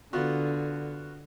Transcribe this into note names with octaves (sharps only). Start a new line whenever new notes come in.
D3 B3 F4 F#4